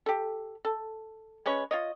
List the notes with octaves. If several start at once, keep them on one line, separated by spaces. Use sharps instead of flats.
G4 A4
A4
G#3 C#4 B4 C#5
F4 C#5 D#5